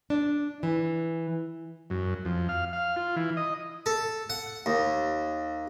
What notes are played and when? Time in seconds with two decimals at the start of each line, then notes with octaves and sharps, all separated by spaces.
0.10 D4
0.63 E3
1.90 F#2
2.25 F2
2.49 F5
2.73 F5
2.96 F4
3.16 E3
3.37 D#5
3.86 A4
4.30 F#5
4.66 D#2